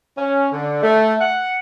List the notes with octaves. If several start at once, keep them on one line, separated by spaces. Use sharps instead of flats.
C#4
D3
A3
F#5